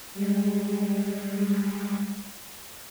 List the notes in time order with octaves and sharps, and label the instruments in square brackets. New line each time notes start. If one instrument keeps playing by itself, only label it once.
[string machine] G3 G#3